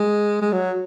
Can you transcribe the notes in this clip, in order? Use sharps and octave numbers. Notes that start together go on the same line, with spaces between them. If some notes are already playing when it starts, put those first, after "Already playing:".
Already playing: G#3
G#3
F#3